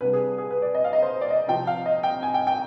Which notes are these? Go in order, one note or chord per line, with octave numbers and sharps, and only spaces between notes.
C2 C3 G3 D4 B4
G#4
G#4
B4
D5
D#5
F5
D#5
C5
D5
D#5
C3 F3 C4 G5
F5
D#5
G5
G#5
G5
G5